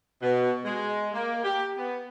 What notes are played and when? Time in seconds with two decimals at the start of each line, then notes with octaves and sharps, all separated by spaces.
0.22 B2
0.65 G#3
1.13 A#3
1.44 G4
1.77 B3